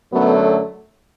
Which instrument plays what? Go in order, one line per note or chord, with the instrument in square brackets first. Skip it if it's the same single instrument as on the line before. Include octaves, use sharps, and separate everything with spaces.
[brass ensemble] F#2 D3 F#3 A3 B3